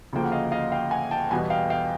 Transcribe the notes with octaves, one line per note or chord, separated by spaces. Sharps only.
D2 C#3 F3 A#3 G5
F#5
D#5 F5
D#5 F5
F5 G5
F#5 G#5
G5 A5
E2 B2 G3 B3 F#5 G#5
F5 G5
F5 G5